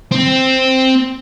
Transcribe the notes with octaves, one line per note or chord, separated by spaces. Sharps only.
C4